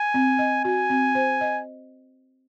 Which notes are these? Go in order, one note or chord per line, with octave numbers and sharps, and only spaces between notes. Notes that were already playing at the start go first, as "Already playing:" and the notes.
Already playing: G#5
C4
D#5
F#4 G#5
C4
C5
D#5